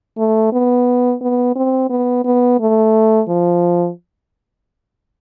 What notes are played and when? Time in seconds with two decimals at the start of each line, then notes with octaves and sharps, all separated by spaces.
0.18 A3
0.53 B3
1.22 B3
1.56 C4
1.90 B3
2.25 B3
2.60 A3
3.28 F3